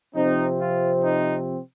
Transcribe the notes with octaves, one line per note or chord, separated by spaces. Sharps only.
C3 F3 C4 D#4
F4
D#4